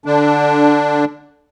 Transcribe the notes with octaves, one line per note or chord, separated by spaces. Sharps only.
D3 D4